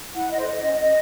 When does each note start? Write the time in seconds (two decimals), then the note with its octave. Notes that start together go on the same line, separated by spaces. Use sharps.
0.14 E4 F#5
0.31 D#5
0.39 A4 C5
0.47 D#5
0.63 C#4 D#5
0.80 D#5